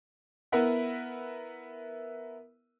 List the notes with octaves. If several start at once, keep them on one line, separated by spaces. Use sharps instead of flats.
B3 E4 A#4 B4 E5 F#5